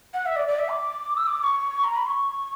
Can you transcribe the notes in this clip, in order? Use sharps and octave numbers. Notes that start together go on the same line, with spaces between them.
F#5
E5
D5
D5
E5
D6
E6
D6
D6
C#6
A#5
B5
C#6